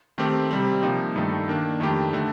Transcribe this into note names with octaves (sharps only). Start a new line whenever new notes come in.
D#3 A3 C4 G4
C3 G3 C4
C3 F3 A#3 D#4 G4
G2 D#3 A3 D#4 A4
D#3 A#3 D4
F2 D#3 A3 D4 G4
D3 A3